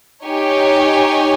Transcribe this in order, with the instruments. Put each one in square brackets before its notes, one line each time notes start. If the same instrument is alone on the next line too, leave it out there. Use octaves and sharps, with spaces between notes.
[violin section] D#4 G4 C#5 G#5